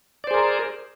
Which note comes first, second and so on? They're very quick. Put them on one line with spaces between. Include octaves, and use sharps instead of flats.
D5 C5 G#4 A#4